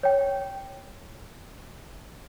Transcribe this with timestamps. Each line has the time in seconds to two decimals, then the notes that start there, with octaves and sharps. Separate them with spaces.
0.03 C#5 G5